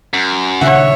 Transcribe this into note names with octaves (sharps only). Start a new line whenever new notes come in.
F#2
D#1 C#3 D4 C#5 E5 F#5